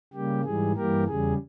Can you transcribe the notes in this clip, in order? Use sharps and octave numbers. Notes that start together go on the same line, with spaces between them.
C#3 G3 A#3 G4
G#2 E3 G3 G#4
G2 E3 G3 A#3 G4 A#4
E2 C#3 G3 G#4